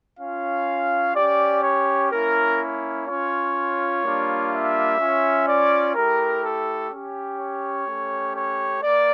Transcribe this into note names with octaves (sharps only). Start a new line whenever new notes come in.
C#4 F4 F5
C#4 G4 D5
C#5
A#3 C#4 E4 A#4
C#4 F4 C#5
G3 A#3 D4 F4
E5
C#4 F4
D5
A3 E4 G4 A#4
A4
C#4 G4
C#5
A3 C#4 G4
C#5
A#3 D5